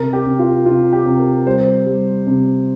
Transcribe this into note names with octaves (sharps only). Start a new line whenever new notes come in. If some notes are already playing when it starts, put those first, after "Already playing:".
Already playing: C3 A#4
G4
C3
F4
C3 F4
G4
C3
A#4
G3 C5
G3
C3